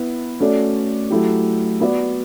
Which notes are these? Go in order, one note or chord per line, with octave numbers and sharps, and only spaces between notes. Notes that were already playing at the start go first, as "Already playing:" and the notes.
Already playing: B3 E4 B4
A3 C#4 F#4 A4 D5
F#3 A3 E4 G4
B3 F#4 B4 D5